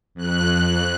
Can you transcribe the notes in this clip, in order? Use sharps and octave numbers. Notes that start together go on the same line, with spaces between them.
F2 F#6